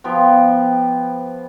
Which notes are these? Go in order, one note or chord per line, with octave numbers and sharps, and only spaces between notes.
F3 B3 G4 G5